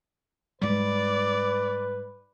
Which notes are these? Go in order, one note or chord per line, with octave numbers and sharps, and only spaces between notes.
G#2 G3 B4 D5